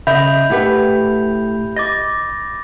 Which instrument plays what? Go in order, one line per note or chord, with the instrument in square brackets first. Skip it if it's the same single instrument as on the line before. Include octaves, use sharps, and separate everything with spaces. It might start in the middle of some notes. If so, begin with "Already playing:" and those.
[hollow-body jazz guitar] C#3 [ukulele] D#5 E5 [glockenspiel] B5 G6 F7
[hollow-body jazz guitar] A2 F#5 [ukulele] E4 G4 B4
[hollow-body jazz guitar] D#5 [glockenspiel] D6 A6 A#6